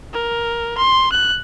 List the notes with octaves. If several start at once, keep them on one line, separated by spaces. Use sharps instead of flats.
A#4
C6
F#6